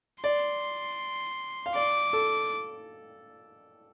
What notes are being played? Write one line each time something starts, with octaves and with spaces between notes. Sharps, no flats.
D5 C6
F5
D5 D6
A4